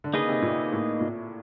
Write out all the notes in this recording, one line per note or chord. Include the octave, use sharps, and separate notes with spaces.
D3
C#3 A#3 D#4 G#4 B4 D#5
C3
A#2
A2
A#2